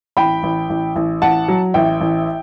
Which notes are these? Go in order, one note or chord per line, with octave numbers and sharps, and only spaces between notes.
A1 G5 B5
A1
A1
A1
A1 F#5 A5
F#3
A1 E5 G5
A1